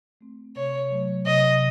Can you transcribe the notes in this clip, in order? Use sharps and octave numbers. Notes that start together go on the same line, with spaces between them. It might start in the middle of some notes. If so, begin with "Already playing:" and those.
A3 C4
C3 C#5
F#3 A3
C3 D#5